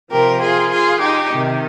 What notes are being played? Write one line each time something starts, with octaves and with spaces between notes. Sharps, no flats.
C3 F3 G4 A#4
F4 G#4
F4 G#4
D#4 G4
C3 D#3